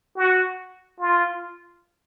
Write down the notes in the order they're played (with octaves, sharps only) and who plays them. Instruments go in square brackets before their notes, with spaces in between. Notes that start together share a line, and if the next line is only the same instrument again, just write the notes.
[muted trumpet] F#4
F4